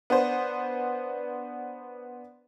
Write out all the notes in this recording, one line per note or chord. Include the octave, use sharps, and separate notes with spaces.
B3 D4 C5